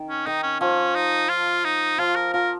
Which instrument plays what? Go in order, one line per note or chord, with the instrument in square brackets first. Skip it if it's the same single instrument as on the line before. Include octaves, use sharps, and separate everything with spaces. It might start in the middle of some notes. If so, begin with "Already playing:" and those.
Already playing: [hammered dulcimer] D#3
[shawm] C#4
[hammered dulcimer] D#3 [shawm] D#4
[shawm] C#4
[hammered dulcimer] F3 [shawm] C#4
[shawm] D#4
F4
D#4
[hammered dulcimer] F3 [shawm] F4
[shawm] A#4
[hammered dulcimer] F3 [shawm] A#4